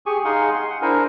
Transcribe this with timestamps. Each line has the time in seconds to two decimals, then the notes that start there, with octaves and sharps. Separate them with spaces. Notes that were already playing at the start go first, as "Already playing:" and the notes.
0.06 G4 G#4 G#5 C#6
0.25 D#4 G#4 F5 F#5 G#5 C6
0.52 C6
0.70 F#5
0.82 D4 E4 A#4 C5 G#5